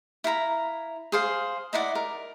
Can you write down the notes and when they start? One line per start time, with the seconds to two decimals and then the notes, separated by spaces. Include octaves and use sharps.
0.24 E4 F5 A#5 B5
1.12 G#4 C5 F5
1.73 D#4 E4 D5 F#5
1.95 A#4